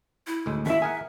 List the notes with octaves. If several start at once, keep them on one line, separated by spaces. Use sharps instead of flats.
E4
D2 A2 G#3
D#2 E4 E5
G#4 A#4 F#5 G#5